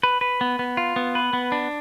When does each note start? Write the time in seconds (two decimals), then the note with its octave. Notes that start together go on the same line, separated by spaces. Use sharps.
0.03 B4
0.21 B4
0.41 B3
0.59 B3
0.77 F4
0.96 B3
1.15 B4
1.33 B3
1.52 D4